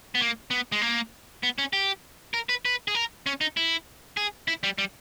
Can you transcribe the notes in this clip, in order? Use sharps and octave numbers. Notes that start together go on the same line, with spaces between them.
B3
A#3
B3
G#3
A#3
B3
C#4
G4
A#4
B4
B4
G#4
A#4
C#4
D#4
E4
G#4
E4
G3
G3